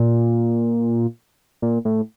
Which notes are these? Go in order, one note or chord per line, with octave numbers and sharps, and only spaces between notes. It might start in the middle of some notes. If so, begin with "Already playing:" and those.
Already playing: A#2
A#2
A2